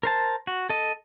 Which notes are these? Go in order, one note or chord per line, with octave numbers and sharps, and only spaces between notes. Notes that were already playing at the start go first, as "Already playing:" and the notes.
A#4 C5 A5
F#4
A4 D#5